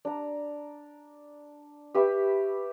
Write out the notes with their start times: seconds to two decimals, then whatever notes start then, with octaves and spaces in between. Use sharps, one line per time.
0.05 D4 A#5
1.95 G4 B4 E5 C#6